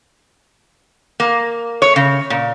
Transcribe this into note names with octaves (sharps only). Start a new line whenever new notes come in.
A#3
C#5
C#3
A#2